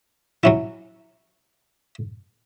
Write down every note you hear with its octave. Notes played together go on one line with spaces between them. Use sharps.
F#3 C#4 E4